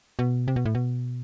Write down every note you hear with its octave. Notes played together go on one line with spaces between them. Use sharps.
B2
C3
B2
A2
B2